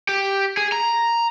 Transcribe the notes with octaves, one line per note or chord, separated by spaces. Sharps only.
G4
G#4
A#5